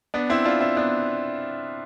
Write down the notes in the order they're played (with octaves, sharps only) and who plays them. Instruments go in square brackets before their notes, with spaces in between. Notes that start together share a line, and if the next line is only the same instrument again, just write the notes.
[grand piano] B3 D4
C4 E4
D4 F4
C4 E4
B3 D4